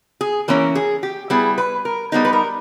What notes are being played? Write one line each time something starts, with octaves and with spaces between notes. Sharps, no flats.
G#4
E3 A#3 C#4 A#4
G#4
G4
G3 B3 E4 G#4
B4
A#4
G3 B3 D#4 G#4
B4
A#4